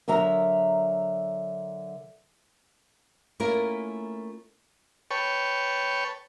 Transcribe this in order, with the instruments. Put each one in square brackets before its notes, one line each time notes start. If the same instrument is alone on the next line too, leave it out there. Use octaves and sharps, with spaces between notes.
[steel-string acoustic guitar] D3 F#3 A#4 E5 A#5
[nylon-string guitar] A3 A#3 C#4 E4 F4 A#4
[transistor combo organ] B4 C#5 G5 A5 C#6